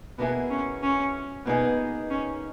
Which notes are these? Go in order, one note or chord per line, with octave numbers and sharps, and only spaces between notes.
B2 A#3 B3 E4 G#4
C#4
C#4
B2 A#3 B3 D#4 G#4 D#5
C#4